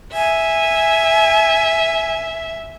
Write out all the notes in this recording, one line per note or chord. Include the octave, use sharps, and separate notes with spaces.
E5 G#5